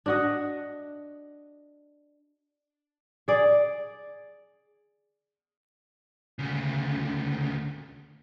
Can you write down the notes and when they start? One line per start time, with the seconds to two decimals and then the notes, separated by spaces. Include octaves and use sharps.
0.06 D4 F#4 D#5
3.28 G#4 D5
6.39 D2 C#3